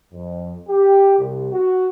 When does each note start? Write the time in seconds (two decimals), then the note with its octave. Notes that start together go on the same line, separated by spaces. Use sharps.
0.12 F2
0.69 G4
1.19 C2
1.52 F#4